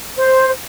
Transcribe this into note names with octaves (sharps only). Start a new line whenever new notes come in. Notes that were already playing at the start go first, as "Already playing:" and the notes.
C5